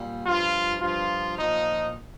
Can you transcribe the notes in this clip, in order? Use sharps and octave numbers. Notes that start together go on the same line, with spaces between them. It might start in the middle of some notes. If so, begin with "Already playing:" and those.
Already playing: A#2 G3
G2 F3 F4
G2 F3 F4
A#2 F3 D#4